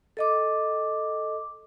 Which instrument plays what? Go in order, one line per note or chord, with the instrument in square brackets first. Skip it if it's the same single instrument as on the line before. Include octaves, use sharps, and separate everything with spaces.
[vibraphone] A4 D#5 D6